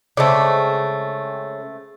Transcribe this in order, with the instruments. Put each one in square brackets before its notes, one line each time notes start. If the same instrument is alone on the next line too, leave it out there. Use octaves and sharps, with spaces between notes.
[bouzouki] C#3 G#3 C4 [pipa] A3 D5